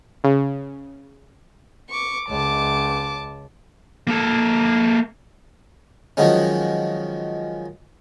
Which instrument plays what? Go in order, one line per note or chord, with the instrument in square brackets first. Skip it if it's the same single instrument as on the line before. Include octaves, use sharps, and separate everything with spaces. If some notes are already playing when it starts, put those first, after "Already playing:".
[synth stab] C#3
[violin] C#6 D6
[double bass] C#2 [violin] A5 D6
[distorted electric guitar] A#3 A4
[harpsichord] D#3 F3 F#3 G#3 C#4